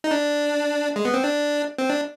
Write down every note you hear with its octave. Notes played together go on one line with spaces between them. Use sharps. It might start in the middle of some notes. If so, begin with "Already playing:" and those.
D#4
D4
G#3
B3
C4
D4
C4
D4